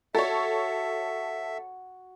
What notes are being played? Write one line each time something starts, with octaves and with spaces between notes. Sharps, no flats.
F#4 A4 C#5 E5